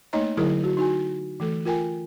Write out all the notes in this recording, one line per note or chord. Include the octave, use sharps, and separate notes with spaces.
A3 A#3 D#4 C#5 D#5 A#5
D3 F#3 E4 G#4 A#4
F#4
D#4 F#4 G#5
E3 A3 A4
F4 A#4 G5 G#5